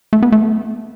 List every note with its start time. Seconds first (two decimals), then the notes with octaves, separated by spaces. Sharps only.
0.13 A3
0.22 B3
0.32 A3